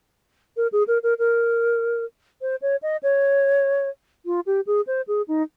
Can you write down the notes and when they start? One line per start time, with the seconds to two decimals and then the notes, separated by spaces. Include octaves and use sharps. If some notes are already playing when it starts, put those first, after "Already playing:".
0.57 A#4
0.72 G#4
0.87 A#4
1.03 A#4
1.19 A#4
2.41 C5
2.62 C#5
2.82 D#5
3.03 C#5
4.26 F4
4.46 G4
4.67 G#4
4.87 C5
5.07 G#4
5.28 D#4